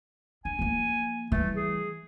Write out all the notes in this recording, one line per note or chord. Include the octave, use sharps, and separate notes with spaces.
D4 G#5
F3 A#3
E3 G3 A3
G#4